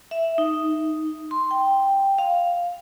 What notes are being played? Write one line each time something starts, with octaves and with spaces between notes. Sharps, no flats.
E5
D#4
C6
G5
F5